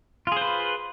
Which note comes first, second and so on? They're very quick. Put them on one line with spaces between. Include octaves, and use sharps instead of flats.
F4 G#4 C5 B4